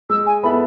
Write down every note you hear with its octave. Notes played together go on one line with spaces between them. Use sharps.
G#3 E6
G#5
B3 E4 A4 E5 B5